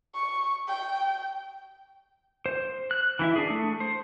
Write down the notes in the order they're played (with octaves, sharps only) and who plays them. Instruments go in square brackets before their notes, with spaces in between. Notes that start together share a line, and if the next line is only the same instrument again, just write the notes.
[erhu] C#6
G5
[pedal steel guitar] C5
F#6
E3 E4 E5
D4 G#4
A3
C5